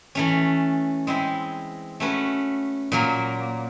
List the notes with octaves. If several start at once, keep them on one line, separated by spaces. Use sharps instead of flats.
E3 A3 C#4
G#3 C4 E4
A3 C#4 F#4 B4
A#2 F#3 A#3